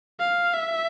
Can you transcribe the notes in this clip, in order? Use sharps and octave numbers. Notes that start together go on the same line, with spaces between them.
F5
E5